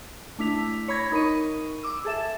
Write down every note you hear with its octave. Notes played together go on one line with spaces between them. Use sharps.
A3 D4 E4 B6 F7
C#5 B5 G#6 A#6
D#4 A#4 B5 C#6 D#7
D6 E6
G#4 A4 E5 E7